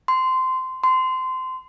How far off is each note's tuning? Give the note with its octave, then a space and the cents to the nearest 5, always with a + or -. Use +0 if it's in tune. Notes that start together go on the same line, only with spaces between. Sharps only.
C6 -15
C6 -20